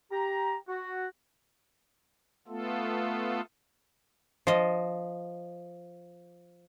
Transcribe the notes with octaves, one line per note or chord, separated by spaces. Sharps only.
G4 A#5
F#4
A3 B3 F4 A4
F3 D#5